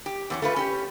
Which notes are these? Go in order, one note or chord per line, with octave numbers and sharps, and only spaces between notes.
G4
E2 C4 C#4
A3 F4 B4
C#4 G4